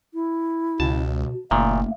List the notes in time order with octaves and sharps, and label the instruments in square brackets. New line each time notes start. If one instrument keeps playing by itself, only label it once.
[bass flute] E4
[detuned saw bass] C#2 [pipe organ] B2 [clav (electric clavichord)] A5
[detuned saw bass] F#1 [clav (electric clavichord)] A#2 D#3 [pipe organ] A3 A#3 [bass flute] E5